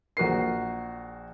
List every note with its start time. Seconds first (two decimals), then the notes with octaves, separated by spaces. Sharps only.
0.17 A#1 F#4 A#4 C7